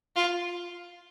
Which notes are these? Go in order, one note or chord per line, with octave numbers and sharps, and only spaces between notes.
F4